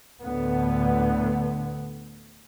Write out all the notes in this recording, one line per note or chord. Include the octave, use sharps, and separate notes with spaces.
D2 A2 D3 B3